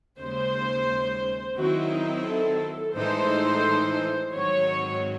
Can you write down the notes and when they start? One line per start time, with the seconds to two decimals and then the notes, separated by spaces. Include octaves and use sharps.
0.19 D#2 C#3 G#3 C5
1.57 D#3 F#3 C4 E4 F#4
1.93 D#4
2.27 A4
2.95 A2 E3 G#3 D#4 A4 C5
4.33 G#2 D#3 F#3 C4 F#4 C#5